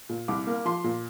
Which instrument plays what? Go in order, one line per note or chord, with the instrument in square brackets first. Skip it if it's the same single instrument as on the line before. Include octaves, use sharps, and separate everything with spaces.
[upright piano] A#2
C2 D6
A#3
F3 C6
A#2